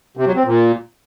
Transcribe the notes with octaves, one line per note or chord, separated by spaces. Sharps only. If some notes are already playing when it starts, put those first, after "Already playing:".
C3
F#3
C4
A#2